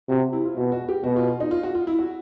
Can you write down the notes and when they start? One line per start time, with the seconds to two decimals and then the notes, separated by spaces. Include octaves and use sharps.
0.09 C3 F#4
0.33 E4
0.45 F4
0.57 B2 F#4
0.72 F#4
0.89 G4
1.04 B2 F#4
1.16 F4
1.27 F4
1.40 D#4
1.51 F4
1.63 F#4
1.75 F4
1.87 E4
1.99 F#4